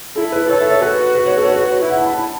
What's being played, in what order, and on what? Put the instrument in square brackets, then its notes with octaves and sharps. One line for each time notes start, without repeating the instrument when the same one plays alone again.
[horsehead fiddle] E4 [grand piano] A4
[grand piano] B4
[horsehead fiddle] A4 [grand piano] C#5
[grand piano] E5
C#5
[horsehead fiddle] F#4 [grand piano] B4
[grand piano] B4
C#5
A4
C#5
B4
B4
C#5
[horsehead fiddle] E4 [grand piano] E5
[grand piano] F#5
A5
B5
A5